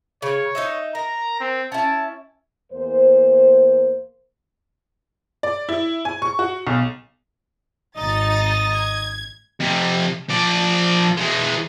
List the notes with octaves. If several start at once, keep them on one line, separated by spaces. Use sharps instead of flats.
C#3 C#5
D#4 D#5 E5
A#4 A#5
C4
C#4 E4 A5
E2 A#3 C5
D5
E4
G#5
C#6
F#4
B1
G#1 D#4 D#5 A6
G#6
F2 C3
F3 D5
E3 G#3